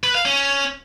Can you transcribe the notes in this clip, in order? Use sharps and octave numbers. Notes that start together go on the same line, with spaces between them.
B4
F5
C#4